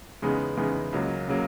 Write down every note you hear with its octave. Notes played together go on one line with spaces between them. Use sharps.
E2 C#3 G#3 B3 D#4
E2 C#3 G#3 B3 D#4
C#2 C#3 F#3 A#3
C#3 F#3 A#3